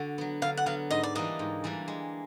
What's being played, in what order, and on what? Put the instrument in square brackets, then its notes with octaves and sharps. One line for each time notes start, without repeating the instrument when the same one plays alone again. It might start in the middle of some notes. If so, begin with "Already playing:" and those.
Already playing: [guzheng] D3 F#4
F#3 B3
[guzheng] D3 [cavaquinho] F5
[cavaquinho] F#5
[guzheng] F#3 B3 [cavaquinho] F5
[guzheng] G#2 [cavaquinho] D#5
[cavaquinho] D5
[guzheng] E3 G3 A#3 D4 [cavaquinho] D#5
[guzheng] G#2
E3 G3 A#3 D4
G#3